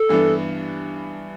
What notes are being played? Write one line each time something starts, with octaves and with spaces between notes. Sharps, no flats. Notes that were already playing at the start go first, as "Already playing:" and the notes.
Already playing: A4
G2 E3 B3 D4